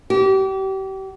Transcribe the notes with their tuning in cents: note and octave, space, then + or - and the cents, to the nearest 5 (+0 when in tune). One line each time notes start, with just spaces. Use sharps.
G4 -35